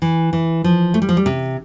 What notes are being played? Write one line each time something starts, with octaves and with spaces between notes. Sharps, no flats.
E3
E3
F3
A3
G3
F3
G3
C3